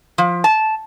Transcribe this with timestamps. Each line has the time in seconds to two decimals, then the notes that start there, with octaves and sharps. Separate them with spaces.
0.18 F3
0.44 A5